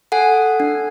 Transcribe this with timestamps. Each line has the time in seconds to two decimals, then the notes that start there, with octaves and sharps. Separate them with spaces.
0.12 A4 F#5 G#5
0.60 D4